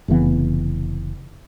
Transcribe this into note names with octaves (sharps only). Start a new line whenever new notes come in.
F1 C#3 E3 B3